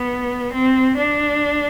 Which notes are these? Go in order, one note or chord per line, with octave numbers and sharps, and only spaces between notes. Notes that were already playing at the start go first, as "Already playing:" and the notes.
Already playing: B3
C4
D4